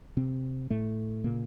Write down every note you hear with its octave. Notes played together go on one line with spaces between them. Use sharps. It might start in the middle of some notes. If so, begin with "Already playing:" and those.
C3 C4
A2 A3
A#2 C#3 A#3